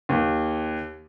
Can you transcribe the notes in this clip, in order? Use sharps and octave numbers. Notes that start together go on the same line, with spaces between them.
D#2